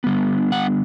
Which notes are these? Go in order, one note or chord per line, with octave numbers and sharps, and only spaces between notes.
D3 G3 B3
F#5